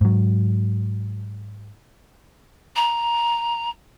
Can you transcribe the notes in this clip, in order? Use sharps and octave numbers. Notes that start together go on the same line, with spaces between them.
G#2 F#3
A#5